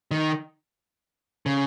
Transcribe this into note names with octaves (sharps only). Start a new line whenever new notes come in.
D#3
C#3